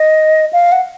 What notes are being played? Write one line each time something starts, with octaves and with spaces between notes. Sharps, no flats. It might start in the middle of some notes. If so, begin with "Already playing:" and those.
Already playing: D#5
F5
F#5